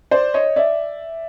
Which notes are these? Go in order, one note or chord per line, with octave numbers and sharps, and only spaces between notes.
C5 D5
C#5 D#5
D5 E5